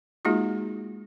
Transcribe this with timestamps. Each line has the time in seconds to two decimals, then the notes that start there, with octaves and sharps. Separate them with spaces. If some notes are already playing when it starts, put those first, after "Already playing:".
0.25 G#3 A#3 D#4 F4 F#4 G#4